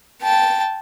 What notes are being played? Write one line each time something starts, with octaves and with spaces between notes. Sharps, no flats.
G5 A5